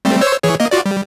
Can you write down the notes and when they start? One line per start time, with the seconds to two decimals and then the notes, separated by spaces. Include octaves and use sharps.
0.05 G3 A3 C4
0.21 C5 C#5 E6
0.43 E3 G#4 C#5
0.60 A#3 D#5
0.71 F4 F#4 D5
0.86 G3